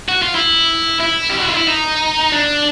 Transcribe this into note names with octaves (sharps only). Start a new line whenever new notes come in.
F#4
F4
E4
E4
G4
F#4
F4
E4
D#4
D4